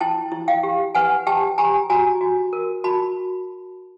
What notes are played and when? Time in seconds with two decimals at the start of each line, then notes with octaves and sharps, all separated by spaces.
0.01 E4 G5 A5
0.32 E4
0.48 F5 G5
0.63 G4
0.95 B4 F#5 G#5
1.27 G4 G5 A5
1.58 G4 G#5 A#5
1.90 F#4 G#5 A#5
2.21 F#4
2.53 A#4
2.84 F#4 A5 B5